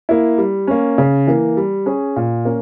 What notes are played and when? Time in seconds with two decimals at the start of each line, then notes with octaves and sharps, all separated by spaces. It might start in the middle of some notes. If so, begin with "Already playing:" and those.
0.09 A#3 E4
0.38 G3
0.67 A#3 C#4
0.98 C#3
1.27 E3 A#3
1.57 G3
1.86 C#4 G#4
2.16 A#2
2.45 A#3 C#4